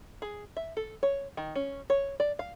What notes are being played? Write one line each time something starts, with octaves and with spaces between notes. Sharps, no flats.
G#4
E5
A4
C#5
D#3
C#4
C#5
D5
F5